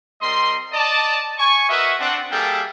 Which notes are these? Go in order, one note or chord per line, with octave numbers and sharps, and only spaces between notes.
G3 C4 A#4 D#5 C6
D5 D#5 A5
G#5 C#6
F#4 A#4 B4 D#5 E5
C4 D4 F#5
G3 A#3 G#4 A4 E5 G5